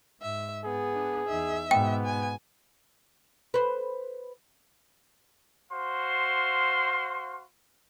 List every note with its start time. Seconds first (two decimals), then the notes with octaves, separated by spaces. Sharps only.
0.22 G#2 E5
0.65 B3 G#4
0.94 D4
1.28 E2 D#4 E5
1.71 G#2 B2 B3 G5
2.05 G#5
3.54 B4 C5
5.71 F#4 C5 F5 C6